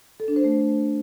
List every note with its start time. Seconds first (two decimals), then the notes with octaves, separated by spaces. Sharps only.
0.20 A4
0.28 D4
0.36 C5
0.44 A3